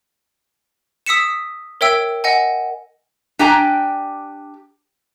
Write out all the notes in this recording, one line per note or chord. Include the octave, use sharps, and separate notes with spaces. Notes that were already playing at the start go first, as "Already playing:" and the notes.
D#6 E6 B6 C#7 E7
A#4 C#5 E5 G5 E6
D#5 F#5 G#5
D4 G4 G5 G#5 A#5